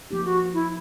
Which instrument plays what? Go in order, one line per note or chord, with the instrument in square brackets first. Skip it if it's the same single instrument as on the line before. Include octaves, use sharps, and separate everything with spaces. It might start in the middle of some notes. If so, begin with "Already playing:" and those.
[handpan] F3 A#3 D#4 [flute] G4
[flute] F#4
E4